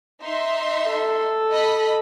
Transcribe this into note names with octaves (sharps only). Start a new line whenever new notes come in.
D#4 E5 C6
A4
D#5 B5